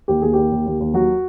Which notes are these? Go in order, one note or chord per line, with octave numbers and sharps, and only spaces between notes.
D#2 G4
D#2 G#4
D#2 G4
D#2
D#2
D#2
F#3 F#4